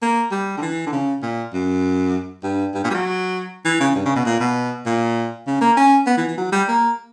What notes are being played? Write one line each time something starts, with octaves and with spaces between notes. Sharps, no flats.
A#3
G3
D3
E3
D3
C#3
A#2
F#2
G2
G2
A#2
G3
F#3
E3
C#3
G2
C#3
B2
A#2
B2
A#2
C#3
A#3
C#4
B3
E3
E3
F#3
G3
A#3